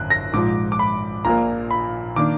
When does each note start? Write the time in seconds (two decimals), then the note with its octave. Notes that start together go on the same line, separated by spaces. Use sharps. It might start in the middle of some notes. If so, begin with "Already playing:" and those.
Already playing: G#1 F#2 D3 F#6
0.10 A#6
0.33 A#1 G#2 F3 D6
0.72 D6
0.79 B5
1.25 A#1 A#2 F3 A#3 A#5
1.71 B5
2.16 D#3 A#3 D4 D6